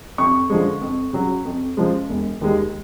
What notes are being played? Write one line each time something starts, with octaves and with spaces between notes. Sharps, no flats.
F2 C#6
D3 F3 G#3
F2
C#3 F#3
F2
C#3 F3 G#3
E1
D#2 D#3 G#3